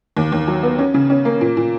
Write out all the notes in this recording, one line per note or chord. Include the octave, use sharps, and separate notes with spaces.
D#2
D#2
F#3
B3
C#4
C#3
C#4
A#3
A#2
A#2